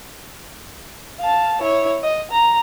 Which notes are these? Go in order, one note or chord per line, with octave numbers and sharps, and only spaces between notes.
F5 A5
E4 C#5
D#5
A#5